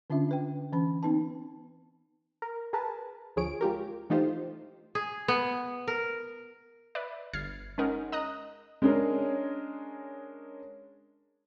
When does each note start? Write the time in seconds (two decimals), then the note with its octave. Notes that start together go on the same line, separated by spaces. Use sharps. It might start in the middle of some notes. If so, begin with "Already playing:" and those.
0.10 D3 C#4 D4 F4 E5
0.29 D4 B4 G5
0.72 E3 C#4 B5
1.03 B3 C4 D#4 B4 A5
2.42 A#4
2.73 G#4 A#4 B4 A5
3.36 D2 F3 G#4 C#5 D7
3.61 G#3 F4 G4 A#4
4.10 E3 A3 D#4 F4 G4 C5
4.95 G#4
5.28 B3
5.88 A#4
6.95 B4 D5 E5
7.33 G1 F6 G#6 A6 C7
7.78 G#3 C#4 D#4 A#4 F#5
8.12 D#5 A#5 D#6 F#6
8.82 G#3 C#4 D4 G#4 A#4 C#5